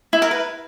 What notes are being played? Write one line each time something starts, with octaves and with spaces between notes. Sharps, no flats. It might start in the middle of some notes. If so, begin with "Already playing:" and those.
E4
A#4
B4